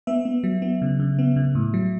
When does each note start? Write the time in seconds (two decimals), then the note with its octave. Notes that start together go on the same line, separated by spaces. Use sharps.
0.07 B3 E5
0.25 B3
0.44 F#3
0.62 B3
0.82 C#3
1.00 C#3
1.19 B3
1.36 C#3
1.55 A2
1.74 F#3